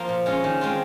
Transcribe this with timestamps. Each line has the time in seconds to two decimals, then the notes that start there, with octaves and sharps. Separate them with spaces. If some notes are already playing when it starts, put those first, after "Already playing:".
Already playing: F3 A#3 F4
0.09 A#2
0.26 G#3 C#4 F4
0.44 D#3
0.61 G#3 C4 F4